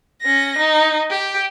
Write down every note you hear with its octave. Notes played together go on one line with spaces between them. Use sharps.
C#4 A#6
D#4
G4